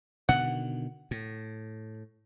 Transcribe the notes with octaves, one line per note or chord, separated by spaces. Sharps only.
B2 D3 D#3 F#5
A2